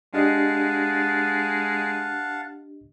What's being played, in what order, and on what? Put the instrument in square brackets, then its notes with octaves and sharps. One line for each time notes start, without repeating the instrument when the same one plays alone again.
[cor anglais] G#3 [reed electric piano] D4 G4 D#5 [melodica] F5 F#5 A5